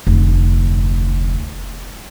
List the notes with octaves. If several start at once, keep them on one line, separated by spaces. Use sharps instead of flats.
F1 D2